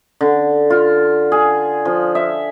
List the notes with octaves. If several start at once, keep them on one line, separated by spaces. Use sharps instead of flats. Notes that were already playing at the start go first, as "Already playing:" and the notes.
D3
F4
G#4
F3
E5